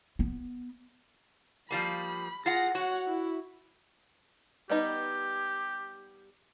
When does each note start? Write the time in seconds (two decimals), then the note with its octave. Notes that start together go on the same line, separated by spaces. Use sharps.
0.19 B3
1.71 F3 G3 A#3 B5
2.46 F4 G#4 F#5 A#6
2.75 F#4 C#5 F#5
3.07 E4
4.70 G3 B3 D#4 G4